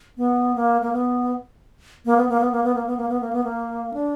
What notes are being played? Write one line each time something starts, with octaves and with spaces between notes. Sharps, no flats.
B3
A#3
A#3
B3
A#3
B3
A#3
B3
A#3
B3
A#3
B3
A#3
B3
A#3
B3
A#3
D4